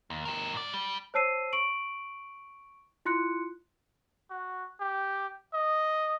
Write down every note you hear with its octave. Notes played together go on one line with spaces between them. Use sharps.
D#2
G4 A#4
G#2 D5
G3
C5 C#5 A5 E6 C7 D#7
C#6 D7 F#7
E4 F4 C6 F#6 C#7
F#4
G4
D#5